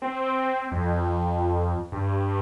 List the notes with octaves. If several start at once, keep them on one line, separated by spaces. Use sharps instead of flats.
C4
F2
G2